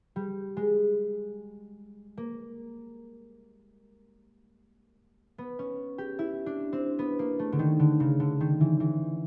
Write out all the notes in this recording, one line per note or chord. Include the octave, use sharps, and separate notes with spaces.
G3
G#3
A#3
B3
C#4
G4
E4
D4
C4
B3
A#3
A3
D3
D#3
D3
C#3
D3
D#3
E3
E3